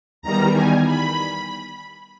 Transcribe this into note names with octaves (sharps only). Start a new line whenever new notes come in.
E2 D#3 G3 A#5
G#5
B5